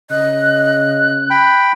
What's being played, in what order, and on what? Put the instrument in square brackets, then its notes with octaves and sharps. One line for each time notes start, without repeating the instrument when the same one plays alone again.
[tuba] C#3 [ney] D#5 [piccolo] F#6
[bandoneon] G5 B5